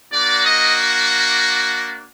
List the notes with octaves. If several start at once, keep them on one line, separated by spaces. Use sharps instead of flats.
A#3 D4 F#4 D5
D#5